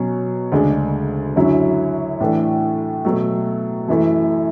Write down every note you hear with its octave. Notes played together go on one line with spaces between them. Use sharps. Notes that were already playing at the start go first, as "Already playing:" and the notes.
Already playing: B2 F#3 C#4
D2 C#3 G#3 D4
F#2 D3 F#3 C#4 E4
A2 E3 A3 D4
B2 F#3 A3
F#2 E3 A3 E4